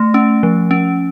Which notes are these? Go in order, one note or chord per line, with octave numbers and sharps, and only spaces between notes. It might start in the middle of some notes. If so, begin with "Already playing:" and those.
Already playing: A3
C#4
F3
C#4